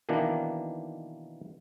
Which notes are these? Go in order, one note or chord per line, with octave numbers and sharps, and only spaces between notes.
B2 D#3 E3 A#3 D4